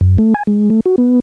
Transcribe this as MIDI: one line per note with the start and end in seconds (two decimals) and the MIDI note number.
0.01 0.17 42
0.18 0.34 57
0.34 0.43 80
0.47 0.69 56
0.70 0.80 57
0.86 0.96 66
0.98 1.20 59